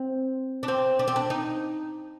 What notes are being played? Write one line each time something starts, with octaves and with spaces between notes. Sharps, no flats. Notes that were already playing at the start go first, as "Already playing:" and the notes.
Already playing: C4
D4
C4
D4
C4
D4
D#4